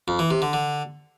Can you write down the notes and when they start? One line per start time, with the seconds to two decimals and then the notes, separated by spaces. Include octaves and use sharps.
0.08 F2
0.19 E3
0.31 C3
0.42 D3
0.53 D3